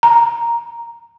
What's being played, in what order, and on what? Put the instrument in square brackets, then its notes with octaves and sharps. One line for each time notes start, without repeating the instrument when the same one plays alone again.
[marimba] A#5